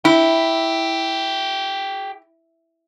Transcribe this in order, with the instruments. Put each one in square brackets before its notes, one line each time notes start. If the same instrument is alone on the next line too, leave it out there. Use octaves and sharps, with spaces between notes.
[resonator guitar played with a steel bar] E4 [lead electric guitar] G#4 G5